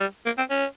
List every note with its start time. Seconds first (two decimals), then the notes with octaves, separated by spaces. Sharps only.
0.01 G3
0.26 A#3
0.38 C4
0.50 C#4